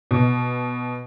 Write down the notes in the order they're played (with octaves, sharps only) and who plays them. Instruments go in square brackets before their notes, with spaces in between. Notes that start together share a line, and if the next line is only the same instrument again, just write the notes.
[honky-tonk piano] B2